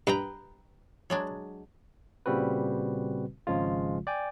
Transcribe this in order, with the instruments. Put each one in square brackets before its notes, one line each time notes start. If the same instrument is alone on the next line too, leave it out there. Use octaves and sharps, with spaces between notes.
[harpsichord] G2 [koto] B4 G5 A#5
[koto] F#3 G#3 D4
[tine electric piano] A#2 C#3 G3 C4 F#4 B4
G#1 C#3 F3 G#3 F4
D5 G5 G#5